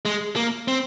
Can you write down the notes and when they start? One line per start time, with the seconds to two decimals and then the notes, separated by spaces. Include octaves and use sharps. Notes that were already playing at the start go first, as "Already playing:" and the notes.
0.05 G#3
0.36 A#3
0.68 C4